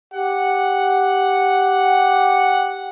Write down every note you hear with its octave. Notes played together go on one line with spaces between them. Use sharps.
G4 F#5